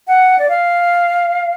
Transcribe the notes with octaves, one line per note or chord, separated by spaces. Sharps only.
F#5
D5
F5